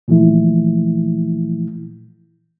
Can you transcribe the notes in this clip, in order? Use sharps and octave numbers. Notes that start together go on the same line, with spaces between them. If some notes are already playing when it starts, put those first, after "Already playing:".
A#2 E3 F3 A3 E4